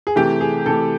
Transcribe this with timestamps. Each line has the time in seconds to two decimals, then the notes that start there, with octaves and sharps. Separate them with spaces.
0.07 G#4
0.16 C3 E3 A3 G4
0.41 G#4
0.66 C3 E3 A3 A4